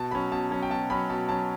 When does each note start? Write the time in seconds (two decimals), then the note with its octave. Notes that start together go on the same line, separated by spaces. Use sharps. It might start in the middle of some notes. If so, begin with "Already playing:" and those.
Already playing: B2 A5
0.11 F#3 C#4 B5
0.32 B2 A5
0.51 F#3 C#4
0.62 G5
0.70 B2 A5
0.90 F#3 C#4 B5
1.10 B2 A5
1.28 F#3 C#4 A5